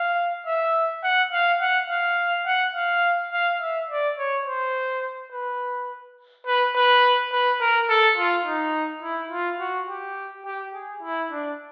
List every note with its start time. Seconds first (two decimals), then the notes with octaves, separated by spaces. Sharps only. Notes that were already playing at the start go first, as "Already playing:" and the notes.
Already playing: F5
0.46 E5
1.03 F#5
1.32 F5
1.61 F#5
1.89 F5
2.46 F#5
2.75 F5
3.32 F5
3.61 E5
3.89 D5
4.18 C#5
4.46 C5
5.32 B4
6.46 B4
6.75 B4
7.31 B4
7.60 A#4
7.89 A4
8.17 F4
8.46 D#4
9.02 E4
9.31 F4
9.60 F#4
9.89 G4
10.45 G4
10.74 G#4
11.02 E4
11.31 D4